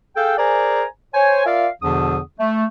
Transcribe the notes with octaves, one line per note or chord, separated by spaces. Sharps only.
G#4 A4 F5 G5
G#4 A#4 C5 D5 G#5 A#5
C5 C#5 G#5
F4 A#4 D5 E5 F5
E2 B2 D3 F3 D4 D#6
A3